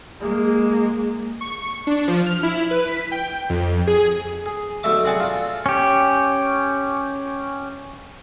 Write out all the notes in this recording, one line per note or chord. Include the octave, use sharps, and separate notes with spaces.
G#3 A#3
C#6
D4
F3
F6
E4
B4
B6
G5
F2
G#4
G#4
B1 D3 A3 E5 D6
C4 G#4 D5 F#5 G#5 A5
D4 F4
C#4 G4